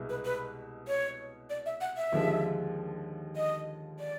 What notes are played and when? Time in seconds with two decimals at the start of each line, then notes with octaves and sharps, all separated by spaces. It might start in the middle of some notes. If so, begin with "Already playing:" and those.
Already playing: C2 B2 G#3
0.09 B4
0.25 B4
0.88 C#5
1.50 D5
1.66 E5
1.81 F#5
1.97 E5
2.12 D#2 D3 F3 G#3
3.36 D#5
3.99 D5